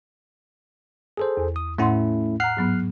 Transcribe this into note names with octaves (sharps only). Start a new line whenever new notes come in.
G#4 A4 C5
E2
D#6
A2 A3 C#4 E4 F#5 C6
F#5 A#5 F6 F#6 C7
G#2 F#3 B3